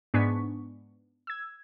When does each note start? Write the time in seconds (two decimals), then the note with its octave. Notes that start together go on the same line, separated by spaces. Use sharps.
0.14 G#2 B3 D4 G#5 C#6 B6
1.27 E6 G#6